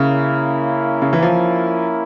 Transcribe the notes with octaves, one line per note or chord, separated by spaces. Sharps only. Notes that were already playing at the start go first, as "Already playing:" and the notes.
Already playing: C#3 A#3 C#4 E4 A#4
C#3
E3
F3